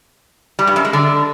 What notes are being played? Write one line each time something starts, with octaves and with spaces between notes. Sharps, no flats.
G3
G2
F#2
G#3
D3